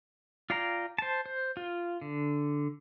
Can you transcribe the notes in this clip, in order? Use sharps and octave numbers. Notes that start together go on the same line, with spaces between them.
F4 D5 F5 G5 A#5
C5 A5
C5
F4
D3